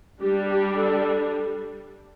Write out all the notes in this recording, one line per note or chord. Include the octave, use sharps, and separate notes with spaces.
G3 D4 G4
G4
A4